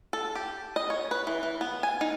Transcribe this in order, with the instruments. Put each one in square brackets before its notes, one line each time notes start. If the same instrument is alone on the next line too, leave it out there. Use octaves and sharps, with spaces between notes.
[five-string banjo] A4
G4
D#5
C#5
B4
E3
E3
B3
G#5
D#4